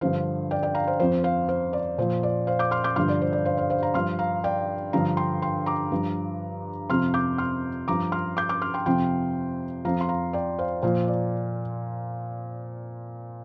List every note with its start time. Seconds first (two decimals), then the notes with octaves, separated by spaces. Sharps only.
0.01 G2 D3 F3 C5 F5
0.51 D5 G5
0.63 D5 G5
0.75 F5 A#5
0.87 C5 F5
1.00 F2 F3 C5
1.24 C5 F5
1.49 C5 F5
1.73 D5
1.98 A#2 F3 C5
2.23 D5
2.47 C5 F5
2.59 D6 G6
2.71 C6 F6
2.84 D6 G6
2.96 G2 D3 F3 C6 F6
3.08 D5
3.21 C5
3.33 D5
3.45 C5 F5
3.58 C5 F5
3.70 C5 F5
3.83 F5 A#5
3.94 G2 F3 C6 F6
4.19 F5 A#5
4.44 D5 G5
4.93 G2 D3 F3 F5 A#5
5.17 G5 C6
5.42 G5 C6
5.66 A#5 D6
5.92 G2 F3
6.89 F2 C3 F3 C6 F6
7.14 D6 G6
7.38 C6 F6
7.88 G2 F3 A#5 D6
8.12 C6 F6
8.37 D6 G6
8.49 D6 G6
8.62 C6 F6
8.74 G5 C6
8.86 F2 C3 F3 G5 C6
9.85 F2 F3 F5 A#5
10.01 C6
10.09 F5 A#5
10.33 D5 G5
10.59 C5 F5
10.82 A#2 F3 C5 F5
11.08 D5